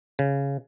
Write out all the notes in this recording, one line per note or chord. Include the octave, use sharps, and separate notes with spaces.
C#3